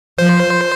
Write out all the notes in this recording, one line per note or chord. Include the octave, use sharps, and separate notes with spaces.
F3 C5